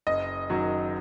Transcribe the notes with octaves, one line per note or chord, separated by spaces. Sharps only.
F#1 D#5
F#2 D#3 F#3